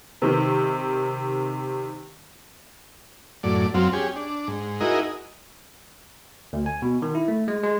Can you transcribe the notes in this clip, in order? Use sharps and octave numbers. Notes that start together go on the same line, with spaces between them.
C3 D#3
F#2 A2 D5
F#2 F#3 C4 F4
C#4 G4 G#4
D4
G#2
D#4 E4 F#4 G#4 A#4 D#5
D2
G#5
B2
D#3
E4
A3
G#3
G#3